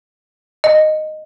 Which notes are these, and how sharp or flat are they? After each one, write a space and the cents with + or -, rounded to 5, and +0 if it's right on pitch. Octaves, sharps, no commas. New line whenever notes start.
D#5 -10